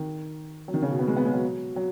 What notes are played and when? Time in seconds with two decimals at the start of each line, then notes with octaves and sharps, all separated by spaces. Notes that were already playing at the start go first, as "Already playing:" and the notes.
Already playing: D#3
0.68 F#3
0.74 D#3
0.82 C#3
0.91 B2
0.99 B3
1.08 G#3
1.17 B3
1.25 G#3
1.34 F#3
1.76 F#3